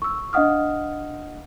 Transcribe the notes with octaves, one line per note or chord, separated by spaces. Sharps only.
C#6 E6
D4 D#5 F5 F#5 D#6 F6